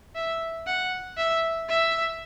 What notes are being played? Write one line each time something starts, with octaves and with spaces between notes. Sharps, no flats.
E5
F#5
E5
E5